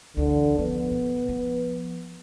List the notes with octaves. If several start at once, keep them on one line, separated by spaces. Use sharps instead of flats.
D2 D3 E3
F3 B3
A#2
F3